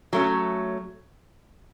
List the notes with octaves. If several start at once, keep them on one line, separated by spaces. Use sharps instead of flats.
F#3 A3 C#4